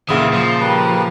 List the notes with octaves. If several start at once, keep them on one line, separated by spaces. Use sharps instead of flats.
A#2 C#3 E3 B3 E5 D#6
F3 C5
G3 A#3 B4